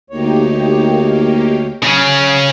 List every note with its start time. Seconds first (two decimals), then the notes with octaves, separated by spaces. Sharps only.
0.10 D2 A#3 D#4 G4 C#5
1.82 C#3 F#3 C#4